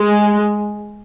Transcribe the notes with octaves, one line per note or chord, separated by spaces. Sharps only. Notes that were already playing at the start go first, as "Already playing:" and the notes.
Already playing: G#3